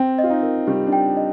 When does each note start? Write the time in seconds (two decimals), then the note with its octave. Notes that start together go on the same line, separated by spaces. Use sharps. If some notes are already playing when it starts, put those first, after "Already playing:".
Already playing: C4 G5
0.18 D#5
0.23 F4
0.30 D#4
0.43 A#4
0.67 G3 G4
0.86 D4
0.92 G5
1.17 D#5